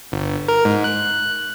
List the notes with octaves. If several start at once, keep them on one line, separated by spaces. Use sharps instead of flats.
G1
A#4
G#2
F#6